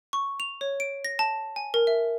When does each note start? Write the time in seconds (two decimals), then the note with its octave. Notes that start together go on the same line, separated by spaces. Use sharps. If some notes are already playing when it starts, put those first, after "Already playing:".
0.13 C#6
0.40 F7
0.61 C#5
0.80 D7
1.05 A#6
1.19 A5
1.56 G#5
1.74 A#4
1.87 E5